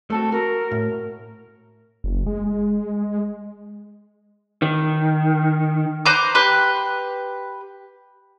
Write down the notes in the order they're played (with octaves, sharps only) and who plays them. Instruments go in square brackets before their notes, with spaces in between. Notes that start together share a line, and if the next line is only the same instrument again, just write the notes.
[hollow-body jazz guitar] A3 C4 F#4 [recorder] A4
[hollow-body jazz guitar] F#4 [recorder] A#4
[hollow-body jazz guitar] A2
[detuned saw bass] F#1
G#3
[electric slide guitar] D#3
[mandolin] B4 C5 A#5 D6
G4 B4 C6 F#6